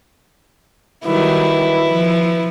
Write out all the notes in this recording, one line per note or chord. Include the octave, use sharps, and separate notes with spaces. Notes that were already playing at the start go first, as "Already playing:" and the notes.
D#3 F#3 G3 E4 B4
F3